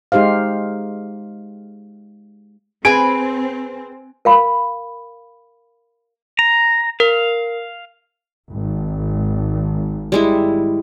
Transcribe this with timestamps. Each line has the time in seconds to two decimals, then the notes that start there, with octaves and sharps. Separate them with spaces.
0.12 G#3 D#4 G4 C5 F5
2.85 C4 G#4 B4 G#5 D7
4.25 A#4 F5 B5
6.39 A#5
7.00 A#4 F5
8.50 G#1
10.12 G3 G#3 E4